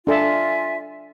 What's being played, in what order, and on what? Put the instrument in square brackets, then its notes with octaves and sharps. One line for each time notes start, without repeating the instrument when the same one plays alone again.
[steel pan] D4 A4 A5 [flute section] F4 E5 G#5